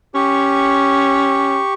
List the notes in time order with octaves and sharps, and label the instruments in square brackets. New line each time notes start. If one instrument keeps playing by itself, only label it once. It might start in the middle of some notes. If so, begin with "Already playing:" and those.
[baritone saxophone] C#4 [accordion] G4 C#6